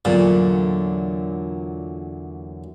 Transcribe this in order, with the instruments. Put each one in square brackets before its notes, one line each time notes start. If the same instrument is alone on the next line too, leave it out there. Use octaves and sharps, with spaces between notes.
[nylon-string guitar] E2 D3 F#3 [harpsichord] A#2